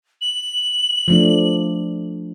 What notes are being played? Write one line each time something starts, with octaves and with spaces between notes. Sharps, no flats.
F#7
F3 A3 D4